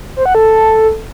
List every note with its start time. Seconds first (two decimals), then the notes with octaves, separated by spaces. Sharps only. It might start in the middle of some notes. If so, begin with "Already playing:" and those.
0.16 C5
0.26 F#5
0.35 A4